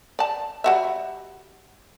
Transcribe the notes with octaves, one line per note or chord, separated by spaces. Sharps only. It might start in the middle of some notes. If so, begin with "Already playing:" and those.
D5 A5
G3 F#4 E5